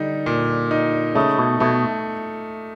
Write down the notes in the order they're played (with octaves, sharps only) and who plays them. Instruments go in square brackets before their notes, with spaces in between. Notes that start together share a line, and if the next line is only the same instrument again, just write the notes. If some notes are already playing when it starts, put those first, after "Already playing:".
Already playing: [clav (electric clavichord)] D3 [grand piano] G3 D#4
[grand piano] A#2
D#4
[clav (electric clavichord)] C#3 [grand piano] A3
[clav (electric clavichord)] B2
[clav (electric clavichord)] B2 [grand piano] A3